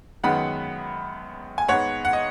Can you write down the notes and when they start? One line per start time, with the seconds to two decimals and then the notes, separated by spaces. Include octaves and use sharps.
0.24 F#2 D#3 G#3 B3 F#5 B5
1.58 G#5
1.68 G#2 G#3 B3 C#5 F#5
2.05 F#5
2.13 D#5